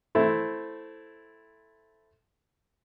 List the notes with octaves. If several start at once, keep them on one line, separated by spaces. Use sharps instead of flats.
A3 C4 E4